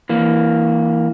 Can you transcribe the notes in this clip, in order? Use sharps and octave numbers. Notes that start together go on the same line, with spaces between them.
E3 A#3